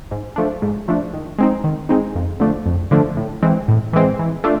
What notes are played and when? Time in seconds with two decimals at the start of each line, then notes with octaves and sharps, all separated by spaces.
0.11 G#2
0.36 F3 A3 D4
0.62 G#2
0.88 F3 A3 D4
1.14 D#3
1.39 G#3 C4 D#4
1.64 D#3
1.89 G#3 C4 D#4
2.15 F2
2.40 D3 F3 A3 D4
2.66 F2
2.91 D3 F3 A3 D4
3.17 A2
3.43 E3 G#3 C4
3.68 A2
3.93 E3 G#3 C4
4.19 E3
4.44 A3 D4 F4